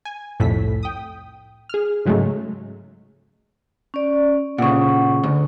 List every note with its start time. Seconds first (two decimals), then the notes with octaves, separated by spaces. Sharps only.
0.05 G#5
0.40 C2 F2 A2 A4 B6
0.83 G5 D#6
1.69 G#4 F6
2.06 G#2 C#3 F#3 G#3 A3
3.94 C#4 D5
4.58 A#2 C#3 F#5 C#6
5.23 D2